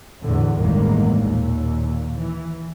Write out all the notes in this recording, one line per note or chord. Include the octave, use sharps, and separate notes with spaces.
E2 A2 D3
A1 E2 G2 D#3 G#3 A#3
D#2 A#2
E3